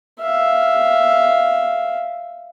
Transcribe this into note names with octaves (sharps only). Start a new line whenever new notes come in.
E5 F5